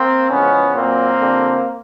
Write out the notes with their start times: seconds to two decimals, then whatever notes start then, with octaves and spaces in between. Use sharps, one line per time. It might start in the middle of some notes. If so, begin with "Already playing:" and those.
Already playing: A#3 C4
0.30 E2 C#3 F3 G#3 B3 C#4
0.74 A#2 F#3 A#3 C4
1.19 F2 D3 G3